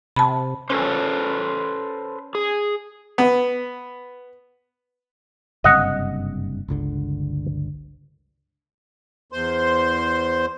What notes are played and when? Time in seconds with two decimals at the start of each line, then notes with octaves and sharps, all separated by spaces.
0.16 C3 A5 B5
0.70 C#4 A4 B4 C5
2.35 G#4
3.18 B3
5.64 F#1 G2 C3 D#5 F#5
6.68 G1 C#2 D3
9.32 E2 C5 C6